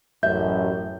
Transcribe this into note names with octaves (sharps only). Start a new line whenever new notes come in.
A1 F#2 E5 G6